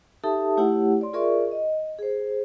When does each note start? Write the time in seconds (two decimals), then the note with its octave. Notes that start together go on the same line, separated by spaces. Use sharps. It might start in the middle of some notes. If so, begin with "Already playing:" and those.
0.24 D#4 G4 A4 E5 A5 D#6
0.57 A3 E4 G4 C#5 F#5
1.01 D5 C6
1.13 F4 G#4 A#4 D5 E5 C#6
1.51 D#5
1.99 G#4 C5